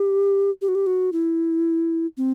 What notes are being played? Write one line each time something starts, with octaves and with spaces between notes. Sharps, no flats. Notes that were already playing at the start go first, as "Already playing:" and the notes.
Already playing: G4
G4
F#4
G4
F#4
E4
C4